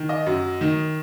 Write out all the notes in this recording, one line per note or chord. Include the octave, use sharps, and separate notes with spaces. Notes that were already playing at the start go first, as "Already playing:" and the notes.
Already playing: D#3
D#5
F#2
D#3